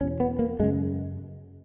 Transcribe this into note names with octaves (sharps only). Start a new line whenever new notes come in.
E2 B2 C#4
B3
A#3
F#2 C#3 G#3